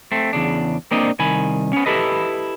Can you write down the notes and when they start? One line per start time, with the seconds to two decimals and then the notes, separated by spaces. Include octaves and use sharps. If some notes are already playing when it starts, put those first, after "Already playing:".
0.12 A3 C4
0.33 E2 C#3 D4
0.91 A#3 C4 D4 D5 D#5
1.19 C2 D#3 G#5 B5
1.73 B3 C#4
1.86 E4 G4 A4 B4 D#5